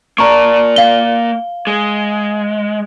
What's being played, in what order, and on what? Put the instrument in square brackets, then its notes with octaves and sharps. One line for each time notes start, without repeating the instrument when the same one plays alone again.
[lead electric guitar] A#3 D5 [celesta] A5 A#5 C#6
[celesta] F5 G7
[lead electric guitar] G#3